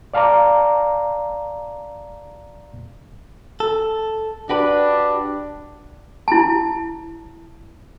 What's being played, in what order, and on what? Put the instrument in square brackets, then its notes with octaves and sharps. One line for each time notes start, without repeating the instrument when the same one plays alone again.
[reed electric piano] D5 F5 A5 A#5 D6
[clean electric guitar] A4
[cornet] D4 [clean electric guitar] F#4 G4 B4
[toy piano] E4 A5